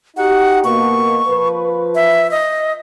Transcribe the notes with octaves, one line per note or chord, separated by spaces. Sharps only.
D#4 F#4 G4 F#5
B2 A#3 C#6
F3 B4
E5
D#5